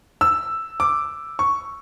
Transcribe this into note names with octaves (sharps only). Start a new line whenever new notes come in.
E6
D6
C#6